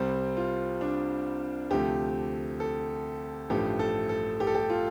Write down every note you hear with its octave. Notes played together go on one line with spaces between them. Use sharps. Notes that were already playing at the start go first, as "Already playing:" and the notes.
Already playing: C2 C3 G3 C4
F4
D4
D2 C3 F3 A3 G4
A4
A1 G2 F3 A3 G4
A4
A4
G4
A4
G4
F4